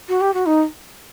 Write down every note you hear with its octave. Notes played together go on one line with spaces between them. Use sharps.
F#4
G4
F#4
D#4